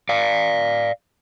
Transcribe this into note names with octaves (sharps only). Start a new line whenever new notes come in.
D5 F5